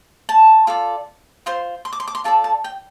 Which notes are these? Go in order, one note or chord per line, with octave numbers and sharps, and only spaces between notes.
A5
F4 A4 D5
F4 C5 C6
C6
D6
C6
D6
C6
F4 A4 D5 A5
A5
G5